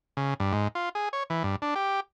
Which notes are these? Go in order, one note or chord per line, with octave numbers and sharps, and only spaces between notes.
C#3
G2
G#2
F4
G#4
C#5
E3
G2
D4
G4